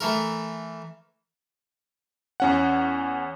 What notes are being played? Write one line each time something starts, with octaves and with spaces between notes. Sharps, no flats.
E3 A3 A#4
E2 C#4 F#5